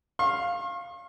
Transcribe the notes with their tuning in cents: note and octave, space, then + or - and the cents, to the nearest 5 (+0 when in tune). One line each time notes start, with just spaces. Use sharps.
F5 +0 C#6 -45